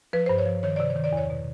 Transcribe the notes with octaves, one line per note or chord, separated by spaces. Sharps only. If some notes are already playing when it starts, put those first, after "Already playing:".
F3 B4
G2 C5
C#5
F3
D#3 C#5
C3 D5
C#5
D#3
D5
E2 C#5
B2